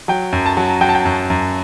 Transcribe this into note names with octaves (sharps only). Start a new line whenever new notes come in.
F#3 G5
F#2
A5
F#3
F#3 G5
A5
G5
F#2
F#2